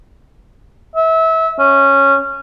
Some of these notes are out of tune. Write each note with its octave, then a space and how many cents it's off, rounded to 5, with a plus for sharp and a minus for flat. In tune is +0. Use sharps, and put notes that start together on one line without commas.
E5 -25
C#4 -10